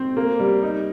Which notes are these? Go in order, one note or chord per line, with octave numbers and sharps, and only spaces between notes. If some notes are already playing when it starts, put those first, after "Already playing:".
Already playing: C4
A#3
G3
D#4